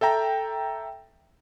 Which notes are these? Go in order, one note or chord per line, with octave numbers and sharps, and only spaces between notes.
A4 E5 G5 A#5